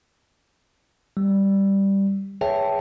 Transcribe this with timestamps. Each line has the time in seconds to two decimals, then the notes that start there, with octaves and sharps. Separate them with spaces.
1.17 G3
2.41 G#4 B4 C#5 E5 G5 A5